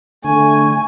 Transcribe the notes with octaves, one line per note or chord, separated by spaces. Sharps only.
D3 A3 G#5 C#6